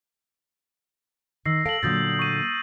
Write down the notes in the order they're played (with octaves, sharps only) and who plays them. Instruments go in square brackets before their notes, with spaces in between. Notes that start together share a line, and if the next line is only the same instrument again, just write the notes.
[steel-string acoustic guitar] D#3 [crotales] E6 A#6 C7
[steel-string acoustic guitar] A4 F5 [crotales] D7 F#7
[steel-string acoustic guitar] A#2 D3 F#3 [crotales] D#6 G6 A6
[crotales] C#6 D#7